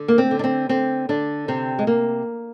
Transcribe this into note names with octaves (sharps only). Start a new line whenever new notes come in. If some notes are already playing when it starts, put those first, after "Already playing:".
Already playing: D3
A#3
C4
D3
D4
C4
D3 C4
D3 D4
C3 C4
G#3
C3 A#3